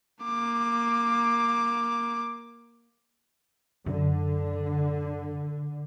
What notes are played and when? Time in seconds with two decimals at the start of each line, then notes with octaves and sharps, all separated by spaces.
0.25 A#3 D6
3.86 F#2 D3